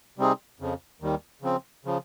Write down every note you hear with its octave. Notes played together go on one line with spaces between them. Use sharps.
C3 G3 C4 D#4 G#4
F2 C#3 F3
D#2 D#3 G3
C#3 F3 C4
C#3 F3